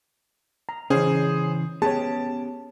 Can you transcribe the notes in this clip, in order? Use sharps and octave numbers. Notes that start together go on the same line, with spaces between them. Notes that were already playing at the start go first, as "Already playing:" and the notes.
A#5
C#3 E3 C#4 G#4 C5
B3 C#4 G4 G#4 C#5 A5